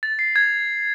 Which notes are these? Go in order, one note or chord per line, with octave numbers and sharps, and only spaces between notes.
A6
C7
G#6